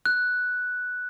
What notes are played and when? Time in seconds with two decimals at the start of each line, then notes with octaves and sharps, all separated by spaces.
0.06 F#6